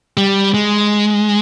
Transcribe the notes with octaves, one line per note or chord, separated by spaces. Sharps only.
G3
G#3